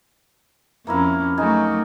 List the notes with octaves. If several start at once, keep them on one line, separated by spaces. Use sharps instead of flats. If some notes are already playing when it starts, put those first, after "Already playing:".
F2 A#3 C#4 E4 A#4
F#3 A3 D#4 F#4 G#4